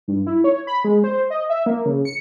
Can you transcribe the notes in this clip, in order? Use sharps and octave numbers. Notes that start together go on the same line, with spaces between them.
G2
E4
C#5
B5
G#3
C5
D#5
E5
A#3
C#3
C#7